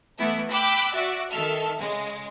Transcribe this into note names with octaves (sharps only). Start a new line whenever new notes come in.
E3 A3 B3 E4
G5 B5 D6 E6 F#6
F#4 D5 E5
D#3 A4 E5 F6
C#3 G#3